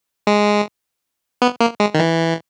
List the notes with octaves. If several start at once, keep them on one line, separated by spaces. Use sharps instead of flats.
G#3
B3
A#3
G#3
D#3
E3